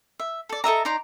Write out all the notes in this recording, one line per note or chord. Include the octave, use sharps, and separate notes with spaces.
E5
A4 D5
A4 D#5 E5 A#5
D#4 D5 A#5 C6